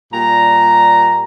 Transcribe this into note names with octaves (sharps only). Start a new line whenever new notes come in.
A#2 G3 A#5